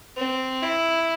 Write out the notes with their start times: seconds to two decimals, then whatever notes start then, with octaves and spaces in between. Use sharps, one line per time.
0.17 C4
0.63 E4